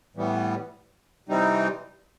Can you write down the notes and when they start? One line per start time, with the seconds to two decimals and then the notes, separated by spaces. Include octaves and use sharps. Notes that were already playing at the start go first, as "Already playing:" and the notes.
0.16 A2 E3 G3 B3
1.28 C3 E3 G3 C4 D#4